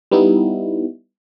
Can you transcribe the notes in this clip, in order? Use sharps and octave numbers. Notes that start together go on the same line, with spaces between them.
G3 B3 D#4 E4